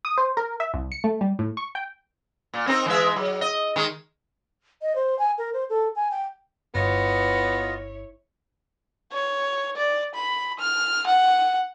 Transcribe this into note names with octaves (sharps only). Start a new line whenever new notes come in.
D#6
C5
A#4
E5
C2
C#7
A3
G3
A2
C#6
G5
A#2
C4 D#4 A#4
E3 G#3 E5
F#3
D#5
D#3 G#3
D#5
C5
G#5
A#4
C5
A4
G#5
G5
G1 B3 E4 F4 C#5 D#5
C#5
D5
B5
F6
F#5